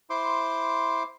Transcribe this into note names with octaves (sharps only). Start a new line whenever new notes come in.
E4 C5 C6 D6